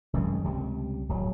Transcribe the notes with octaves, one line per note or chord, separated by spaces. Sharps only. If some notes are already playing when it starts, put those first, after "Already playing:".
F1 F#2 D#3 G#3
C#2 C3 G3
D1 G1 F#3